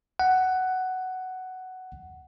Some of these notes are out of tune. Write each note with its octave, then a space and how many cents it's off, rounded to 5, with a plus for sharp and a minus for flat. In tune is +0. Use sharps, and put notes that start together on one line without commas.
F#5 +10